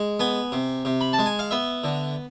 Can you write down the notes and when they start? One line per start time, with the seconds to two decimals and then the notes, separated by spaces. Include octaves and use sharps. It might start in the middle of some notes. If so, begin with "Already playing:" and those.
Already playing: G#3
0.20 B3 G#5
0.52 C3
0.85 C3
1.01 B5
1.13 A5
1.19 G#3
1.26 G#5
1.39 F5
1.51 B3 E5
1.84 D3